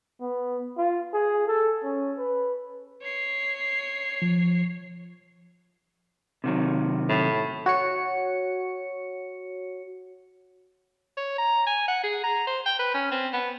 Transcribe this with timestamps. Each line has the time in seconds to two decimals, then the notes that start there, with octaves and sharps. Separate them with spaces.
0.21 B3
0.78 F4
1.13 G#4
1.48 A4
1.84 C#4
2.18 B4
3.03 C#5 C7
4.22 F3
6.44 C3 D#3 F#3
7.09 A2
7.66 F#4 C#5 C#7
11.17 C#5
11.38 A#5
11.66 G#5
11.88 F#5
12.03 G#4
12.24 A#5
12.47 C5
12.66 G5
12.79 B4
12.94 C#4
13.12 C4
13.33 B3